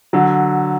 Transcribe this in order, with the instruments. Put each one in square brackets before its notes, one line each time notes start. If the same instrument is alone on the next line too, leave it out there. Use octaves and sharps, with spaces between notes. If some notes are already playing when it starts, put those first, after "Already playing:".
[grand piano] D3 F#3